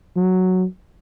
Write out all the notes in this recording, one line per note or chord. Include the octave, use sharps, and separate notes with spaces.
F#3